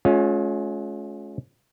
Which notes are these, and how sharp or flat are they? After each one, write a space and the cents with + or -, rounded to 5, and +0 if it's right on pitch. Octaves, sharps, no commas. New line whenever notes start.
G#3 +40 C#4 +0 F4 +30